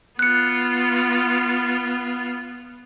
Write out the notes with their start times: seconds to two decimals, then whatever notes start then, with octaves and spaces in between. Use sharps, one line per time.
0.19 B3 F4 F#6 C#7